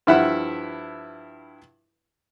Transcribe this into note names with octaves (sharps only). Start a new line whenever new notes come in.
G2 F3 E4 E5 F#5 B5